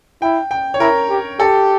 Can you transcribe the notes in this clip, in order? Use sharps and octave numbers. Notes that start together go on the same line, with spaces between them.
E4 G5
G5
C#5
E4 A#4
G4
G4 A4